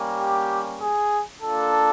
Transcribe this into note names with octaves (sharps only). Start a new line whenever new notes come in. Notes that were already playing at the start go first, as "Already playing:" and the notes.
Already playing: G3 A#3 C#4
G4
G#4
A#3 D4 F4 A4